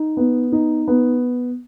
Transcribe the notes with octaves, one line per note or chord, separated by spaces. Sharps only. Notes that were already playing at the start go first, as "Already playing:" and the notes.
Already playing: D#4
B3
D#4
B3